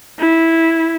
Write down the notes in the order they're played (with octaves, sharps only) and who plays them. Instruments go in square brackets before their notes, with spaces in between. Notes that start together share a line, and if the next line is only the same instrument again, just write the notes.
[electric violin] E4